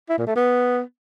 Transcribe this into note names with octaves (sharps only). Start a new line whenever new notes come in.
E4
A#2
A3
B3